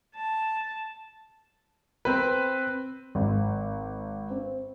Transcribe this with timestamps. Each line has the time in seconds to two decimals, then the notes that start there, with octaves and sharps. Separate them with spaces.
0.15 A5
2.05 C4 B4
3.15 G#1
4.30 C4